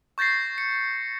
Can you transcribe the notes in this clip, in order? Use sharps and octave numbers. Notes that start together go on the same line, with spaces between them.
C#6 G6 A6 A#6 C7
C#7